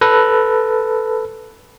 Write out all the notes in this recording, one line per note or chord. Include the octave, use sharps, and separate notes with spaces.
A4 B4